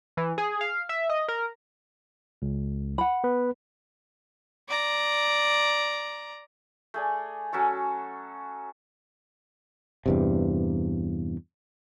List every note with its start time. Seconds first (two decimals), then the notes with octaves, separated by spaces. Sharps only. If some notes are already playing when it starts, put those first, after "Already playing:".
0.17 E3
0.38 G#4
0.61 F5
0.89 E5
1.09 D#5
1.28 A#4
2.42 C#2
2.98 F#5 B5
3.24 B3 B4
4.69 D5 A#5
6.94 A3 G#4 D5
7.53 F#3 C#4 A4 C#6
10.06 E2 G2 C3